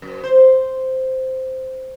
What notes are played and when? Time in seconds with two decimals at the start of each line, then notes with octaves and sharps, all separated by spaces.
0.02 F#2
0.24 C5